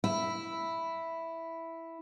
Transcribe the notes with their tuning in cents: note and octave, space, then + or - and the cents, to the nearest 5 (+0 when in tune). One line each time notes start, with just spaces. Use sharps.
E4 +0 E5 +0